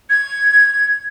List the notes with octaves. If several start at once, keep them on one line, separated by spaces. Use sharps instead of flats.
G#6